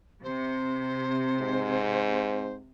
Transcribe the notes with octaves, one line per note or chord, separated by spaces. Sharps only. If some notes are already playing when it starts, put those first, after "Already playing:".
C3 C5
G#2